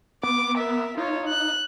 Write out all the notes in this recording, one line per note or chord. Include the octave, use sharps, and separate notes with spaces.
B3 D6
A#4 E5
D#4 F4 C#5
F#6